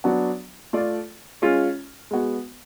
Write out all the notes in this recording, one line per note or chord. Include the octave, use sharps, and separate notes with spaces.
F#3 B3 D4 F#4
A3 F4 A4 D5
G#3 C#4 F4
G#3 B3 F#4